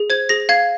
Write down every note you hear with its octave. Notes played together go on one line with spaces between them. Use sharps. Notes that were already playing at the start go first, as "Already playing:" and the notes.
Already playing: G#4
C5 G#6
G#4 A#6
F5 G#6